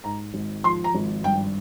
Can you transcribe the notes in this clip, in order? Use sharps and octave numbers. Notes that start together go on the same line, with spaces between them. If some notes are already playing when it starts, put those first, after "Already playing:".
G#2 A#5
G#1
F3 C6
A#5
G#1
G2 G5